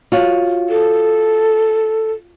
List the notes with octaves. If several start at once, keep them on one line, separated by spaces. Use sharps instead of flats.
F4 F#4 C#5
A4